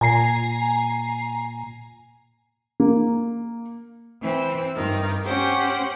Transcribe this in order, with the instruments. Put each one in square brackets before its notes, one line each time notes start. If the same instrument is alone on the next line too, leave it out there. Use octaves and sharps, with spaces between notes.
[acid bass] A#2 [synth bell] G#5 A#5 C7
[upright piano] A#3
[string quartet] E3 C4
G2 D#3
C#4 G4 C5 F#5 C6